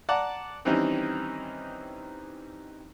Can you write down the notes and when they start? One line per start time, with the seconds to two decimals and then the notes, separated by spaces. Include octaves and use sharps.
0.09 D5 F#5 A5 A#5 D6
0.65 D#3 E3 G3 C4 C#4 D#4